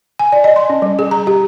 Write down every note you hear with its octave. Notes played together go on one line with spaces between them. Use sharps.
G#5
D5
D#5
C6
C#4
G3
G#4
A#5
G4